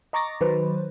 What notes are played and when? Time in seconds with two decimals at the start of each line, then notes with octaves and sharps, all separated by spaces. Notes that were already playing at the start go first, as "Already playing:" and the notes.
0.13 D#5 A#5 C#6 D6 A6 A#6
0.41 D#3 F#3 B4 C5